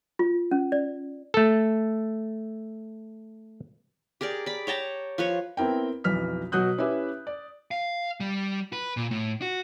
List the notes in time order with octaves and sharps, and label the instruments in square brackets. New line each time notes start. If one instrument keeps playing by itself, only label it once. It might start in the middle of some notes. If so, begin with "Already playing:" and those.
[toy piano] F4
C#4
D5
[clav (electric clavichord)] A3 A4
[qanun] G4 G#4 A#4 D5
D5 B5
C#5 G5 A5 A#5
F3 B4 C#5
[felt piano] B3 C4 E4 A#4 G5
B1 F2 E3 F6 B6
B2 F#3 F#4 D#6 F#6 G6
C#4 E4 G4 B4 E5
D5
[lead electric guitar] F5
G3
B4
A#2
A2
F#4